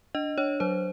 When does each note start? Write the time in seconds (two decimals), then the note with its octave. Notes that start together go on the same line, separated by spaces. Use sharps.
0.15 D4 D#5
0.38 D4 C#5
0.60 F#3 C5